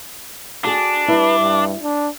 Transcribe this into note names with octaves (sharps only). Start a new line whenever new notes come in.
D4 F#4 G#4
G3 E4 B4
G2
D4